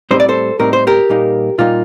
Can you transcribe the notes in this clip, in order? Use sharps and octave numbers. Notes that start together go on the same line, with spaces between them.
A2 G3 C4 D#4 C5
D5
A4 C5
A2 G3 C4 D#4 A#4
C5
G4 A#4
A#2 G3 A#3 D#4
A#2 G3 A#3 D#4 F4